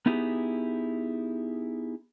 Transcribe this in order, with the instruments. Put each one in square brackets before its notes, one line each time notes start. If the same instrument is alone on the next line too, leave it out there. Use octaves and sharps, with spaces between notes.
[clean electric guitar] B3 D#4 E4 G4 G#4